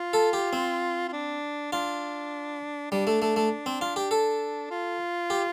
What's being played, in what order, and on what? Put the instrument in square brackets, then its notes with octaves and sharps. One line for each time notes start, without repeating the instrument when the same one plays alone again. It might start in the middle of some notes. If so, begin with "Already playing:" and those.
Already playing: [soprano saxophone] F4
[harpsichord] A4
G4
C4
[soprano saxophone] F4
D4
[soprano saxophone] D4 [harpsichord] F4
[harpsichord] G3 [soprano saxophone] D4
[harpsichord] A3
A3
A3
C4
F4
G4
A4
[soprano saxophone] F4
[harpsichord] G4